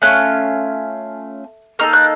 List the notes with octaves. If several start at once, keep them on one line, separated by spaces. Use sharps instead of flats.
A3 C#4 F4 F#6
A#3 D#4 A4 F6
F#6